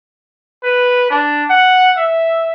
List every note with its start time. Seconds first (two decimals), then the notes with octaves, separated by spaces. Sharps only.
0.64 B4
1.10 D4
1.50 F#5
1.97 E5